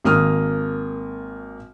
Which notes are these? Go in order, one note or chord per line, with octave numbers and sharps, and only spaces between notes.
G#1 A#3 D#6 F6